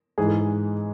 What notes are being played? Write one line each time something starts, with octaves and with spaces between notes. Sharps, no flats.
G#2 E3 G#3 G#4
G#4